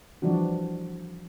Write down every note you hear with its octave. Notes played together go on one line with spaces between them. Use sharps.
E3 F3 G3 D4 F#4